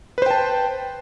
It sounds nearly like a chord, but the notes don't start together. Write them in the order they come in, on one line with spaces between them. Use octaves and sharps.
B4 C5 G5 A5